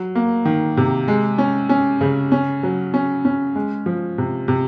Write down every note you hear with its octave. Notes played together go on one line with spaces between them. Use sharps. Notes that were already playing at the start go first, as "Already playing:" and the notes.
Already playing: F#3
A#3
D#3
C3
G#3
C#4
C#4
C#3
C#4
F#3
C#4
C#4
G#3
F3
C3
C3